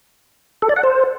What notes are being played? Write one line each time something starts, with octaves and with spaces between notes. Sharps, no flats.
A4
D5
F#5
C5